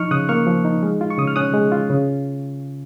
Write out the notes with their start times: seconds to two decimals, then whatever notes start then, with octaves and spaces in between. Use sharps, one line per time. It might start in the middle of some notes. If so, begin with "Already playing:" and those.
Already playing: F3 D#4 C#6 F6
0.11 C#3 D#6 F#6
0.29 A#3 C#6 F6
0.47 F3
0.65 D#4
0.83 G#3
1.01 F4
1.11 C#6
1.18 C#3 D#6
1.27 F6
1.36 C#4 D#6 F#6
1.54 G#3
1.72 F4
1.90 C#3